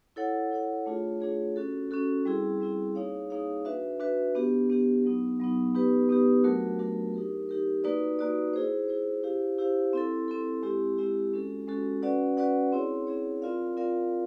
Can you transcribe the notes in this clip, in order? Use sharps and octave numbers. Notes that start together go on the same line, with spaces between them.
E4 A4 C#5 F#5
E4 A4 C#5 F#5
A3 D4 F4 G#4 C#5
A3 D4 F4 G#4 C#5
C#4 F#4 A4
C#4 F#4 A4
G3 C4 E4 G#4
G3 C4 E4 G#4
A#3 D#4 G#4 C#5 F5
A#3 D#4 G#4 C#5 F5
D4 F#4 B4 E5
D4 F#4 B4 E5
B3 D4 G4
B3 D4 G4
F#3 B3 D#4
F#3 B3 D#4
B3 D#4 G4 B4
B3 D#4 G4 B4
F#3 A3 D4 F#4 A#4
F#3 A3 D4 F#4 A#4
D#4 G4 A#4
D#4 G4 A#4
A#3 D#4 F#4 B4 D5
A#3 D#4 F#4 B4 D5
E4 G#4 C5
E4 G#4 C5
E4 G4 C5 F5
E4 G4 C5 F5
C4 E4 A4
C4 E4 A4
G#3 C4 E4 G4
G#3 C4 E4 G4
G#3 C#4 F#4 A4
G#3 C#4 F#4 A4
C#4 F#4 B4 D5 F#5
C#4 F#4 B4 D5 F#5
C4 E4 G#4 C#5
C4 E4 G#4 C#5
C4 F4 A#4 D5 F5
C4 F4 A#4 D5 F5